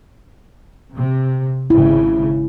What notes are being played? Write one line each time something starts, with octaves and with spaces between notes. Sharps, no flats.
C3
G#1 G#2 C#3 E4